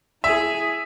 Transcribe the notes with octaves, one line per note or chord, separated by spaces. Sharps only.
E4 G#4 E5